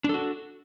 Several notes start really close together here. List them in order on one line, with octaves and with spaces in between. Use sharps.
D4 A4 F#4